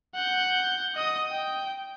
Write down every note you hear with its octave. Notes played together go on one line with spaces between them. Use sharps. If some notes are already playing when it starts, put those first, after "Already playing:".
F#5 G6
D#5 D#6
G5